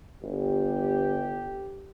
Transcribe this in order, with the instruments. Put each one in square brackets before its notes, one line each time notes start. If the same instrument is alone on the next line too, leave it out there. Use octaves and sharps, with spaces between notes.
[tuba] G1 [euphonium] G4